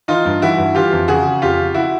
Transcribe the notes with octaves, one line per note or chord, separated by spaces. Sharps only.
E3 D#4 F4
G2
E3 E4 F#4
G2
E3 F4 G4
F2
C#3 F#4 G#4
C#3
F2 F4 G4
C#3
E4 F#4